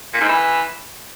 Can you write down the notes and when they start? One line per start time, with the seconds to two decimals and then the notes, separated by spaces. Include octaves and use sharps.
0.14 A#2
0.21 G#2
0.29 E3